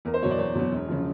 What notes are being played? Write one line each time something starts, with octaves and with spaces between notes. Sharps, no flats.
E2 A#4
C5
B2 F#3 C#5
D5
E2 C#5
B2 F#3
E1
C#3 F3